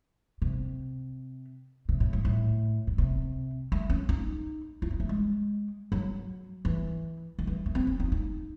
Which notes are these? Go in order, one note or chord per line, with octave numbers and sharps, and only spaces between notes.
C3
C3
A2
G#2
A2
A2
C3
A3
C#4
D#4
E4
D#4
A3
G#3
F#3
E3
D#3
E3
A3
C4
C#4
D#4
D#4